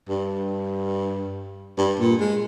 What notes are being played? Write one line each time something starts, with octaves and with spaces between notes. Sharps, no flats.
G2
G2
A#2
G#3